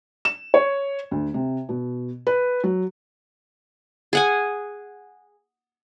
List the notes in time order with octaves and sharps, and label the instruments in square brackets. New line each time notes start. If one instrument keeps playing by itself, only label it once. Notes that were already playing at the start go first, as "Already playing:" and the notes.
[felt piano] E7
C#5
D2
C3
B2
B4
F#3
[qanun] G#4 F#5 G#5